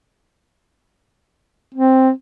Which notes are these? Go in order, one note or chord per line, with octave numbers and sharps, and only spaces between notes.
C4